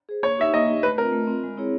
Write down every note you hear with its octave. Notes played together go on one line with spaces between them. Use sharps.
G#4 C5
A#3 C#5
D#4 G4 E5
A#3 D#5
D#4 G4
A3 B4
C4 F4 A#4
A3
C4 F4
G#3
C4 E4 G#4 C#5